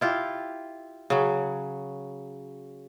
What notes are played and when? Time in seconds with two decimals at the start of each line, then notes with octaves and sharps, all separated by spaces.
0.01 E4 F4 G4
1.10 C#3 F#3